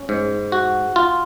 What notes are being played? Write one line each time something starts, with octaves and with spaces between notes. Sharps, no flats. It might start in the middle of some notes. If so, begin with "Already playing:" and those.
Already playing: C#4
G#2
F#4
F4